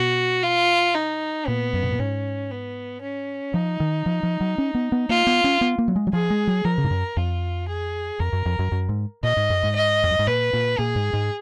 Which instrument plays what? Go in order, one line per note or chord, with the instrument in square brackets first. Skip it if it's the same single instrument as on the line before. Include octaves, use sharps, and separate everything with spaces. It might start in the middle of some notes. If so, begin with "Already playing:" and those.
Already playing: [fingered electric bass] B2 [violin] F#4
[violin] F4
D#4
[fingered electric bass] A#2 [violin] B3
[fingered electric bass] F#2
B2
A#2
[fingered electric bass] G#2 [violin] C#4
[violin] B3
C#4
[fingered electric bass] F3 [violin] D#4
[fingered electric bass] D#3
F3
F3
F#3
C#4
B3
B3
[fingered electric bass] A#3 [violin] F4
[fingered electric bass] B3
C#4
B3
A#3
F#3
G#3
F#3
[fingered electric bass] F3 [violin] G#4
[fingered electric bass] G#3
F#3
[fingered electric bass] F3 [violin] A#4
[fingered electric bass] C#3
G#2
F#2
[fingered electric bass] F2 [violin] F4
[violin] G#4
[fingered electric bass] F2 [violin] A#4
[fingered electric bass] F#2
F2
F#2
F#2
G#2
[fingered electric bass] A#2 [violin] D#5
[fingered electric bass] G#2
F#2
G#2
[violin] D#5
[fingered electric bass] F2
F#2
G#2
[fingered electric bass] A#2 [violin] B4
[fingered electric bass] A#2
[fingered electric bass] A#2 [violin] G#4
[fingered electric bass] G#2
G#2